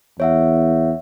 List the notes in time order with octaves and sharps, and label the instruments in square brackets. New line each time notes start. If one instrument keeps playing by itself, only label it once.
[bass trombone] E2 [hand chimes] C#5 E5 F#5